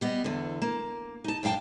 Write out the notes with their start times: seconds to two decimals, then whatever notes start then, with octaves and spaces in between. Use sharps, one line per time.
0.01 G3 B3 D#5
0.24 E2 D3
0.62 A#3
1.24 D#4 A5
1.43 F#2 D4 F5 G5 A5